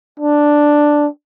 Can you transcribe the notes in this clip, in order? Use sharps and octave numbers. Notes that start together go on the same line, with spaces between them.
D4